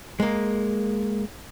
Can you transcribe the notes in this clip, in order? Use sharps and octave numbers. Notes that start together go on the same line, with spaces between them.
G#3 A#3